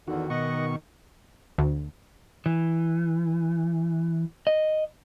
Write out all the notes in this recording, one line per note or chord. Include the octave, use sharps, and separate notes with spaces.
E2 D3 D#3 F#4
B2 D#5 F#5 C#6
D2
E3
D#5